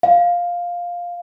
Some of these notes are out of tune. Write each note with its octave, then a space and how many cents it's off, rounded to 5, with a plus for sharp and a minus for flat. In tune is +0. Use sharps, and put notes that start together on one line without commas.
F5 +5